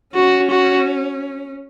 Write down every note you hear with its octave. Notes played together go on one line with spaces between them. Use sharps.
C#4 F#4
F#4